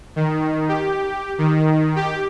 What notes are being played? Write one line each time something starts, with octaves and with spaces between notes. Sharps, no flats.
D#3
G4
D#3
G4